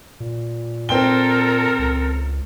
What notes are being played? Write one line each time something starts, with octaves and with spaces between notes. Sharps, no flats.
A#2
C4 A4 A#4 G5 G7
C#2